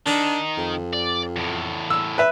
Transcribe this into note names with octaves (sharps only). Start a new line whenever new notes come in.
D#3 D4 D#4
F2
D5
E2 A2
E6
B4 E5